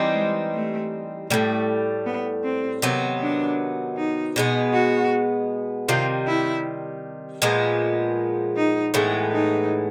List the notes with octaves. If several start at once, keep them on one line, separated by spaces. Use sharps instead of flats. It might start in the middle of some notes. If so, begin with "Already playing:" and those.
Already playing: E3 G3 C4 D#4
G#3
A3
A2 E3 G3 A3
B3
C4
C3 D#3 F#3 B3
D4
D#4
B2 G#3 B3
F#4
C3 D#3 G3 F4
E4
A#2 F3 G#3 B3
D#4
A2 E3 G#3 B3
D#4